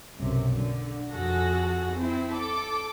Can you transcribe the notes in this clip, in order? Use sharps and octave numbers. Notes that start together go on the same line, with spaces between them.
B1 F#2 C3
D3
F2 F#4 G#4 A4 A#6
C4 E4
A4 D6